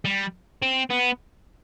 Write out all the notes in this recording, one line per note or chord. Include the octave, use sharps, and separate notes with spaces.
G3
C4
B3